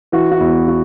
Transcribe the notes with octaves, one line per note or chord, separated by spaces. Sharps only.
E3 F#4
F#4
E2 E4
F#4